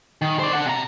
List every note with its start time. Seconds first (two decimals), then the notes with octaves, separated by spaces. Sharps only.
0.22 D#3
0.39 C5 D5
0.53 D4 F#5
0.66 C3 A#5